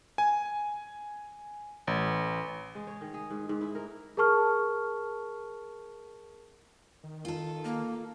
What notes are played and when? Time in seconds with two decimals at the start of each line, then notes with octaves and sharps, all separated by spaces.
0.18 G#5
1.87 A1
2.75 G#3
2.87 C#5
3.01 D#3
3.14 G#4
3.30 G#2
3.49 G#2
3.61 E4
3.75 A#4
4.17 G#4 A#4 A5 C#6 F6
7.03 D#3
7.25 F4 A4
7.65 A#3